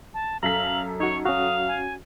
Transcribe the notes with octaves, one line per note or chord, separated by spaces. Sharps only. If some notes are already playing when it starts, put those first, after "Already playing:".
A5
F#2 A4 F5 A#5 B6 F#7
D#4 F#4 C#5 C#6
C#4 F#4 F5 D#6
G#5